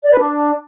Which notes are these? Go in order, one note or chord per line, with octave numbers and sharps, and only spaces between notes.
D5
B4
D4